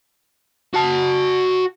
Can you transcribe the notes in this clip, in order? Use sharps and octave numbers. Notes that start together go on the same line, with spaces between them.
F#4 A5